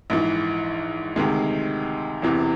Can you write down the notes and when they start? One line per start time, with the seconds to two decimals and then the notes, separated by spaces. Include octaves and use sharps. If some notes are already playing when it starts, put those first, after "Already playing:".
0.10 A#1 G#2 E3
1.16 D2 C3 D#3 G#3
2.22 E1 E2 C3 E3